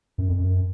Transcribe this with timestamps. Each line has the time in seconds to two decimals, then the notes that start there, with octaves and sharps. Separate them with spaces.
0.18 F#2
0.29 F2
0.39 F#2